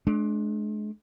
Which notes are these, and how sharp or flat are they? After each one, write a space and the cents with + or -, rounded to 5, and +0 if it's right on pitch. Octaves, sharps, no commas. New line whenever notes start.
G#3 +40 D4 +0